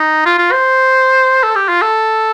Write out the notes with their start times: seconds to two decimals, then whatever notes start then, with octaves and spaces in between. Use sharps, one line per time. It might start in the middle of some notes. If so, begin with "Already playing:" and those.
Already playing: D#4
0.26 F4
0.39 F4
0.52 C5
1.43 A4
1.56 G4
1.69 F4
1.82 A4